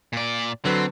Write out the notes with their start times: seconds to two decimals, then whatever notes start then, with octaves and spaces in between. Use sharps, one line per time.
0.13 A#2 D5
0.65 D3 F#3 C4 B4